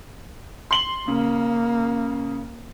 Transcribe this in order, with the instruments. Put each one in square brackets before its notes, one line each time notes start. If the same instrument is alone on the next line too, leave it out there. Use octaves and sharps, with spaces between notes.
[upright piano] C6 F#7 G7
[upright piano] C#3 [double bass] A#3